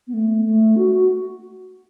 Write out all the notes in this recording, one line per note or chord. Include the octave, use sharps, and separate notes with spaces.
B3
A3
A3
F#4